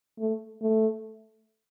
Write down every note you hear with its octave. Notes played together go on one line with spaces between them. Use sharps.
A3
A3